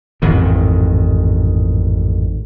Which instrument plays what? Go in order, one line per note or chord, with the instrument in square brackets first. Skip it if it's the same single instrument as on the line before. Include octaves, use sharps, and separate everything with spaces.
[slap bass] A1 F2 G#2 D#3